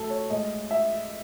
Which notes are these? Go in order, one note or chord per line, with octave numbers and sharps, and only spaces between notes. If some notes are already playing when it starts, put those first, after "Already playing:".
Already playing: A2 F#3 A3 A4
C#5
A2 G#3 D#5
E5